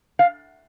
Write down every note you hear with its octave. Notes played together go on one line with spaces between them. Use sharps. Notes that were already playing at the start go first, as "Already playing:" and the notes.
F5